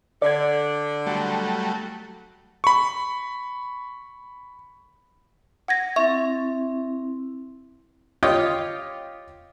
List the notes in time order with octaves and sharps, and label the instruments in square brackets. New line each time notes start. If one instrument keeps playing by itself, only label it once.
[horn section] D3 [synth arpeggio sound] D5 G#6
[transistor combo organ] F#3 G3 A3
[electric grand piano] B5 C#6
[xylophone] F#5 G#6 A#6
[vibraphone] C4 E4 [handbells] E5 [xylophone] C#6
[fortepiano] F4 G4 C#5 D#5 G5 D6